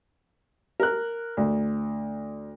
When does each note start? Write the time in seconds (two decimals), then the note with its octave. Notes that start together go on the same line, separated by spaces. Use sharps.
0.80 A#4 F#6
1.37 D2